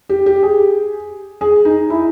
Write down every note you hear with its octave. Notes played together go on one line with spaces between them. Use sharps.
G4
G4
G#4
G#4
D#4
E4